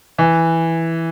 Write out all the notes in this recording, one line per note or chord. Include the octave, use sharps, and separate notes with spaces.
E3